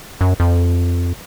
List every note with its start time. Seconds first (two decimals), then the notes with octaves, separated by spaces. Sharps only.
0.21 F#2
0.40 F2